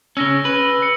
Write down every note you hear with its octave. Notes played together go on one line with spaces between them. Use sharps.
C#3 C#4 E6 A#6 G7
B4
C#7